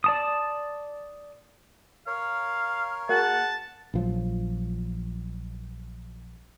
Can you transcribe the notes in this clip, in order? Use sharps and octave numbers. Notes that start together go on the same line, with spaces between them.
D5 A5 D#6
A#4 C#5 F5
A#3 F#4 G#4 F#5 A5
A#1 F3 F#3